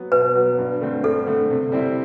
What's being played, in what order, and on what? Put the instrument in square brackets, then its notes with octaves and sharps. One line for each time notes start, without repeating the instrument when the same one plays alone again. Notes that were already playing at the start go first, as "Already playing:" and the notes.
Already playing: [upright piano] F#3 B3
[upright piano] B2 [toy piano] B4
[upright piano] F#3 B3
G2
D3 A3 C4
[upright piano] G2 [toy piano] A4
[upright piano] D3 A3 C4
C3
G3 C4 E4